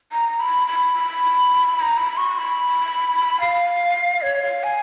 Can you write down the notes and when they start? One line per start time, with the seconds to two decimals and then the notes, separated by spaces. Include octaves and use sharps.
0.12 A#5
0.40 B5
0.67 B5
0.94 B5
1.77 B5
1.82 A#5
1.97 B5
2.17 C#6
2.38 B5
3.40 F5
4.22 C#5
4.42 F5
4.64 G#5